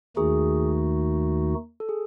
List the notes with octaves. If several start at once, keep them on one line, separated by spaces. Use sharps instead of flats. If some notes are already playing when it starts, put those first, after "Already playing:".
D#2 D#3 A3 D#4 F#4 G#4
A4
G#4